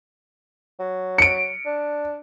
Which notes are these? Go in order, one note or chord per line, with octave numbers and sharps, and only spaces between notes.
F#3
C#7 D7
D4